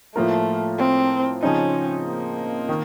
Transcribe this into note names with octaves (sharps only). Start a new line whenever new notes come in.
A2 F3 A3 A#3 F4 A#4
C4
C#3 F3 C4 C#4 D#4
A#3
D#3